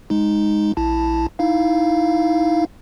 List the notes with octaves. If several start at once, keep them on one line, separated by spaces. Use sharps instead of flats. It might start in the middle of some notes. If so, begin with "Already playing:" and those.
G#3 D#4
A#1 E4 A5
D#4 E4 F5